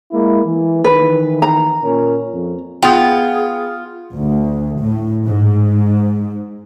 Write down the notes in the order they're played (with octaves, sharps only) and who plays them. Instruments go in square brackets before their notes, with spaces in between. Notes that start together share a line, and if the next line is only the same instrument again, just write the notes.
[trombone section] G#3 A#3 E4
E3
[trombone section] D#3 E3 [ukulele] B4
[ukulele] A#5
[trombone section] A#2 C#4 A#4
F2
[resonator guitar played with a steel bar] B3 G5 [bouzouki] F4 [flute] G#4
[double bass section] D2
A2
G#2